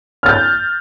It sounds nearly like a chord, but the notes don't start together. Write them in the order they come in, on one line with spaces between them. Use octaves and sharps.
F6 A6 G6